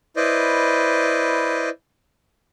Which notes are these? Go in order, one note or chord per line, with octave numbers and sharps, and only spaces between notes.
E4 B4 C5 D5 D#5